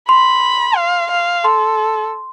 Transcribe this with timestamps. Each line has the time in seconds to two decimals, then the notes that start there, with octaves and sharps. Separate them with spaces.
0.09 B5 C6
0.76 F5
1.11 F5
1.44 A4 C6